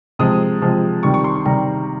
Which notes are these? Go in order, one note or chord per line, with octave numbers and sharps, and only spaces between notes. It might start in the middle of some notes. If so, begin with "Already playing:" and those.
C3 F3 G#3 D#6
C3 F3 G#3
C3 D#3 G3 C#6
C#6
C6
C6
C3 D#3 G3 A#5